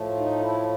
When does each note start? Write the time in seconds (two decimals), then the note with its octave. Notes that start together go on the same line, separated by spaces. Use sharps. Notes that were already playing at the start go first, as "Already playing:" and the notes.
Already playing: A2 F3 A3
0.17 D#4
0.40 E4